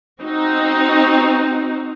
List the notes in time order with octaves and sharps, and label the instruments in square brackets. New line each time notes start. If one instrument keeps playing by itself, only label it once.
[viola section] C4 D#4 F#4